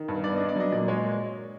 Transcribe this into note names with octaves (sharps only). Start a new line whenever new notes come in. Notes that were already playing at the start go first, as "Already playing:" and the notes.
Already playing: D#3
G2
B3 D5
D4 D#5
D5
F#3 D#5
A#2 D5
G#3 C#5